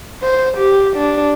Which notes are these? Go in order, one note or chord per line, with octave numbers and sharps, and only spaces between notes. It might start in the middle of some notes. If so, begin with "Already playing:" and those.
C5
G4
D4